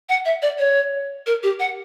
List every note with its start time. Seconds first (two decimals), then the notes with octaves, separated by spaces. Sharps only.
0.09 F#5
0.25 E5
0.42 D5
0.59 C#5
1.26 A#4
1.43 G4
1.60 F#5